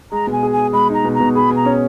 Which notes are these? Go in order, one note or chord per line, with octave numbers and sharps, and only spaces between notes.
G#3 A#5
B2
G#5
G#4
G#5
G#4
G#3 B5
D#4 A#5
B2
A#5
B2
G#4 B5
B2
A#5
C#4